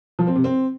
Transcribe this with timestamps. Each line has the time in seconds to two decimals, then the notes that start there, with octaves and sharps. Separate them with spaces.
0.19 F3
0.27 C4
0.36 C3
0.44 C4